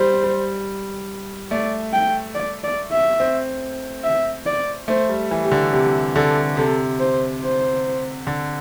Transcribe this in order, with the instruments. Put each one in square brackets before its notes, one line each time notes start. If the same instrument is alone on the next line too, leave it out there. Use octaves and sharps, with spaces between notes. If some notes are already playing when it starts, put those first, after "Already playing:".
Already playing: [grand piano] G3 [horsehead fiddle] C5
[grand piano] G3
[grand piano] A3 [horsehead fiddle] D5
[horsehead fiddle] G5
D5
D5
E5
[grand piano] C4
[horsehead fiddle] E5
D5
[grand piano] A3 [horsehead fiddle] C5
[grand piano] G3
E3
[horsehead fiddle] G4
[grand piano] D3
[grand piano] C3 [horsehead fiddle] G4
[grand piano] D3 [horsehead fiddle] A4
[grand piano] C3 [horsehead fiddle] A4
[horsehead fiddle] C5
C5
[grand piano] D3